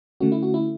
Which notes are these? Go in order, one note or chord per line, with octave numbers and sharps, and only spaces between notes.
D3 A3 C#4 F#4
E4
F#4
E4